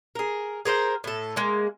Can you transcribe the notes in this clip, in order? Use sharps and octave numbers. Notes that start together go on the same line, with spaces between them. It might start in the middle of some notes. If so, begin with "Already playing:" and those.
G#4 A#4
G#4 A#4 C5 G5
A2 A4
G#3 A#3